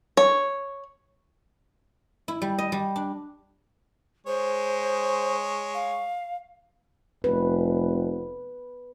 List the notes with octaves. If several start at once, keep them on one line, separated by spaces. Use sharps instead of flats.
C#5
E4
G3
D#5
G3
D4
G#3 C5 C#5
F5
F1 B4